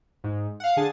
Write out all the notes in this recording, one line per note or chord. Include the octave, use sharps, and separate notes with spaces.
G#2
F5 F#5
D3 G#4 A5